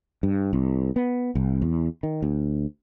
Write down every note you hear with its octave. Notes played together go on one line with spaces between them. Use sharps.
G2
C2
B3
C2
E2
D#3
D2